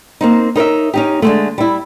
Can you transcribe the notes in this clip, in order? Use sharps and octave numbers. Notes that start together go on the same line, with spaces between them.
A#3 C4 D#4
D#4 A#4 C#5 E5
C#4 D#4 G4
D3 G#3 A3
G3 E4